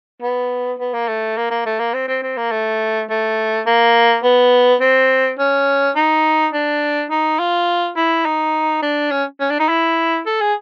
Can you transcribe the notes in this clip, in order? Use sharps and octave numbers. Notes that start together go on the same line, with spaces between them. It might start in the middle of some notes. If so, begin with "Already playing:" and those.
B3
B3
A#3
A3
A#3
A#3
A3
A#3
C4
C4
C4
A#3
A3
A3
A#3
B3
C4
C#4
D#4
D4
D#4
F4
E4
D#4
D4
C#4
C#4
D4
D#4
E4
A4
G#4